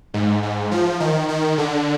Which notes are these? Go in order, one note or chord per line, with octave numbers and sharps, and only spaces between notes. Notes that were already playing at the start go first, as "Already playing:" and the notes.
G#2
G#2
F3
D#3
D#3
D3